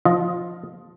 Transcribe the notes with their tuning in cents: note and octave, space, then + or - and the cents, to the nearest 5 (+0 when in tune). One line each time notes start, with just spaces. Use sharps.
F3 +5 F4 +0 D#5 +0